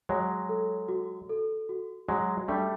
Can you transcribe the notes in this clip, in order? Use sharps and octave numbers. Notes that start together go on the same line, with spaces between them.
F#3 G#3 C#5
A4
F#4
A4
F#4
F#3 G#3 F#4
G3 A3 D4